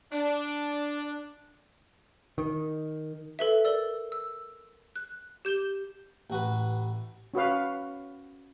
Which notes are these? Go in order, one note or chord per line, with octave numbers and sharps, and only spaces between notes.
D4
D#3
A4 B4 E5
A#4 D5 E6
E6
F#6
G4 G6 E7 G7
A1 F#4 B4
C#4 F#4 B4 F5